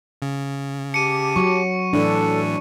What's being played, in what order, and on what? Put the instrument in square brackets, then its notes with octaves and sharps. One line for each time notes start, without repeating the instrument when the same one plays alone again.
[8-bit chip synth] C#3
[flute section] G4 A5 D6 [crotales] C#7 D#7
[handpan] F#3 [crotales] C#6
[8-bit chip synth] A2 E3 [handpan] D4 [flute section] A4